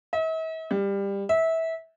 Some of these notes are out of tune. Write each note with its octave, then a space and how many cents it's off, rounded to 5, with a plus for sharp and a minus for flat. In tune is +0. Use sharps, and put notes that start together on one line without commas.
E5 -45
G3 +20
E5 -20